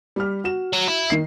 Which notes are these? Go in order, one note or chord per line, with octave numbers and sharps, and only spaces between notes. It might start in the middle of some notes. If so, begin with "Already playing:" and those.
G3 G4 F6
F#4 E7
F#3
E4
D#3 C7